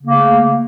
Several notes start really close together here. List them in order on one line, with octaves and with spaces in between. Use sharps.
C#3 A#3 A3